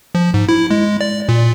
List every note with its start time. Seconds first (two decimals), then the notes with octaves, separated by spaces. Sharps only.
0.15 F3
0.34 G#2
0.49 E4
0.71 G#3
1.01 D5
1.29 A#2